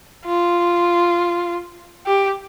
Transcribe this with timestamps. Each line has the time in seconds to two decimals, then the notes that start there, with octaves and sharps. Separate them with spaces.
0.26 F4
2.06 G4